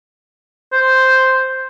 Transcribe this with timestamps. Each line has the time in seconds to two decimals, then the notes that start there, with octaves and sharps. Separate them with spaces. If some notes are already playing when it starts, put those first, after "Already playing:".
0.72 C5